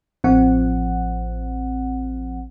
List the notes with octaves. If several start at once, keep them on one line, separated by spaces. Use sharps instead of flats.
A1 F3 C4 F#5